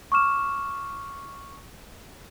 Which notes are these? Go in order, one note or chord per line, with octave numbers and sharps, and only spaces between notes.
C#6 D6 F6 E7